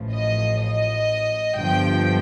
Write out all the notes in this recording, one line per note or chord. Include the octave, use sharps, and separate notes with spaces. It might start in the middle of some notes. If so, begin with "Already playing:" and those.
Already playing: A1 A2 F3
D#5
D#5
G1 G2 F3 G5